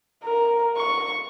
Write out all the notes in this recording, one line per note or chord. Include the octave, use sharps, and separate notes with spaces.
A#4
C#6